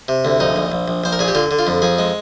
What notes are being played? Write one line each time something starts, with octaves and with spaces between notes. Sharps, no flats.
C3
D2
A#1 D#4
A#1
A#1
A#1
A#1 C5
A#4
A#2 G#4
G4
D3 F4
D3
F4
F2
F2 G#4
G#3